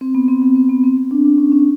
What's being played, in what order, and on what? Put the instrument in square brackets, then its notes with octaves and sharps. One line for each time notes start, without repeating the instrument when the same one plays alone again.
[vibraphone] C4
B3
C4
C4
C4
B3
C4
C4
D4
D4
C#4
C#4